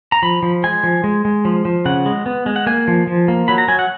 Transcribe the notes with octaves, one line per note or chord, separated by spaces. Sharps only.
A#5
F3 B5
F3
G#3 G#5
F3
G#3
G#3
F3
F3
C#3 F#5
G#3
B3
G#3
F#5
A#3 G#5
F3
F3
A#3
F#3 B5
A#5
F#3 G#5
F#5